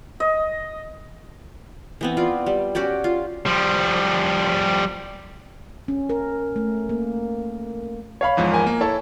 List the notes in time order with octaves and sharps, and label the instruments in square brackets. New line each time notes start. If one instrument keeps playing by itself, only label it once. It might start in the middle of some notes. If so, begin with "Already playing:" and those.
[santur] D#5
[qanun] E3 B3 C4
F4 D5
G3
C#4 F#4 G4 D5
F4
[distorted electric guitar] F3 G3
[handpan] C#4
A#4
A3
A#3
[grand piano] C#5 F5 B5
[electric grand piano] E2 G#2 F3
[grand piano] A#4 G#5
[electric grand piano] A#3
[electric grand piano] E4 A4 [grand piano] C#5 A5